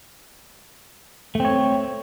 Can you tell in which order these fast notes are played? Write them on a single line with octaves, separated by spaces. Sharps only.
A3 C4 C#5